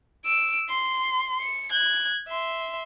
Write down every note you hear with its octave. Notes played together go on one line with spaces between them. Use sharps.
E6 D7
C6
C#7
F#6 G#6
E5 C6